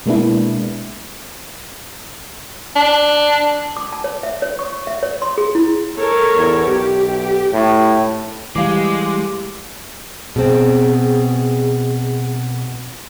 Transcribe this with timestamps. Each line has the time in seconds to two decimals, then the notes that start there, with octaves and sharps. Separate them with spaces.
0.06 B2 G#3 A#3 B3 D4 E4
2.76 D4
3.77 D6
3.93 A5
4.04 C#5
4.23 E5
4.42 C#5
4.59 C#6
4.87 E5
5.03 C#5
5.22 C6
5.38 G#4
5.55 E4
5.95 A4 A#4 C#5
6.35 E2
6.66 B1 G4
7.53 A2
8.56 E3 G3 G#3 G4 F5 D6
10.36 B2 C4 G#4